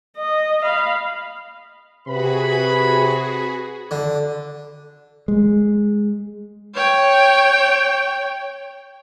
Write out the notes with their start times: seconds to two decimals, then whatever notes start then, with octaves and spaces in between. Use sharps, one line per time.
0.17 D#5
0.63 F5 B5
2.08 C3 F#4 G#4 B4 B5
3.91 D3
5.28 G#3
6.75 C#5 G5